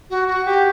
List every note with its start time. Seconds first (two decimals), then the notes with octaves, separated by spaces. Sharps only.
0.10 F#4
0.28 F#4
0.46 G4